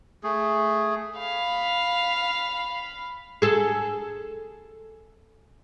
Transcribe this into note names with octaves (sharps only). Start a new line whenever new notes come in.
A3 G#4
F5 B5
G#4 A4